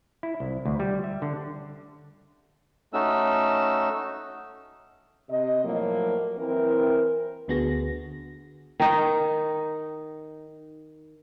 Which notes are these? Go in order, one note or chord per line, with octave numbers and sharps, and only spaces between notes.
E4
C2
D2
G3
E5
D3
A3 C#4 D#4 F#4 E6
C3 D#5
A2 F3 F#3 A#3
E3 C4 E4 A#4
D2 D3 B3 F#4 G#4 A#6
D#3 D#4